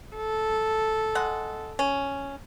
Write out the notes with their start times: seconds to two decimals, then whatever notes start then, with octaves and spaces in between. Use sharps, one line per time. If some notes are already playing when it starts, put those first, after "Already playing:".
0.16 A4
1.15 G#3 F#5
1.79 C#4